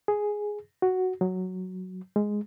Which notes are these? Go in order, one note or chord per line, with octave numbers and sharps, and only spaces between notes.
G#4
F#4
F#3
G#3